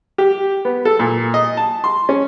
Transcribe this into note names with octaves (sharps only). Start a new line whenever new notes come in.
G4
B3
A4
A#2
D#5
A5
C6
C#4